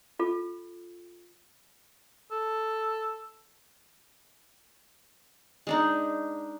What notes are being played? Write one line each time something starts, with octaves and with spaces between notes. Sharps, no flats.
F4 A4
A4
G#3 D4 D#4